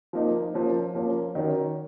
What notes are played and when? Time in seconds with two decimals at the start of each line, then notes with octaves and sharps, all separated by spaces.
0.13 F3 A#3 D#4
0.54 F3 A#3 C#4
0.95 F3 A#3 C#4
1.35 D#3 F#3 C#4